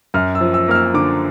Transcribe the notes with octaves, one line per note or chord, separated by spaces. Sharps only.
F#2 F6
E6
F3
E6
A#3 F6
E6
D3 D6